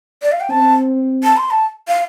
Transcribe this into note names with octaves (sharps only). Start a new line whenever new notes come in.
D5
F5
G5
C4 A5
A5
C6
A5
F5